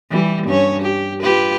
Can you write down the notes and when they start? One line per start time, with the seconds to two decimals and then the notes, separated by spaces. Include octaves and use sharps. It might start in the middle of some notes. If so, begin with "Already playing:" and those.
0.11 E3 G3
0.47 G2 C#4 C#5
0.82 G4
1.22 F4 G4 B4